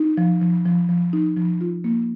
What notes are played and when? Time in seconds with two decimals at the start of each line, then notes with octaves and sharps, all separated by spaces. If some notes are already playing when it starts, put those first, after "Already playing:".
Already playing: D#4
0.17 F3
0.41 F3
0.65 F3
0.89 F3
1.13 D#4
1.37 F3
1.61 F4
1.84 A#3